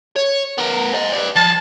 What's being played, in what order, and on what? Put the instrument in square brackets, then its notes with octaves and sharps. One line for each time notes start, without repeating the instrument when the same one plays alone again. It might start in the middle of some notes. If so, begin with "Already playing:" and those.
[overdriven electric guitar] C#5
B3 A#4
C5 D#5
B4 D5
[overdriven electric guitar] F3 [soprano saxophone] A5